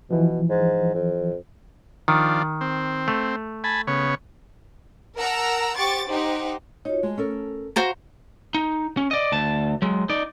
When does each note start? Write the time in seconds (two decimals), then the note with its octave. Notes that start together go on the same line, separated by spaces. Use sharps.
0.11 B2 E3 F3
0.50 G#2
0.94 F2
2.08 D#3 F3 D4
2.61 C4
3.08 A3
3.64 G#5 A5 B5
3.87 C#3 B3 C#5
5.16 A#4 F#5 A5 A#5 E6
5.77 G4 C5 F#5 C#6 D6 A6
6.09 D#4 G4 C5 F#5
6.85 D#4 F4 F#4 C#5
7.03 G#3 A3
7.18 C#4 A4 A#4
7.76 F#4 C5 F5 A#5
8.55 D#4
8.97 C#4
9.11 D5 D#5
9.32 D2 A5
9.82 F#3 G#3
10.10 D#4 D5